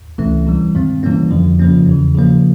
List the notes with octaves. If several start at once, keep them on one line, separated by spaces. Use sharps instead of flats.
C#2 C3 E3 A3 C#4
C3 E3 G3
G2 D#3 G#3 C4
C3 E3 G3 A#3 C#4
F2 D3 F3
C#3 F3 A#3 C#4
E2 C#3 E3
C#3 F3 A#3